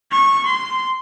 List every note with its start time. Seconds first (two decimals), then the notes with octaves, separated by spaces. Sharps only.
0.12 C#6
0.46 C6